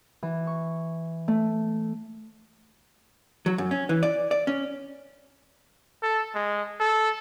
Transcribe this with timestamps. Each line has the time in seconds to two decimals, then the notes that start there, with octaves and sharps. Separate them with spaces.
0.23 E3
0.47 C#6
1.28 A3
3.46 F#3
3.58 F#2
3.71 C#4
3.89 E3
4.03 D5
4.31 D5
4.47 C#4
6.03 A4
6.35 G#3
6.80 A4